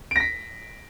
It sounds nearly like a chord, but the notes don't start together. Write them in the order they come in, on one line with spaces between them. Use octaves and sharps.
D7 A#6 B6